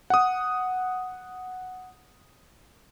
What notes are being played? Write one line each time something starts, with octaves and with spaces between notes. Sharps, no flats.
F#5 D#6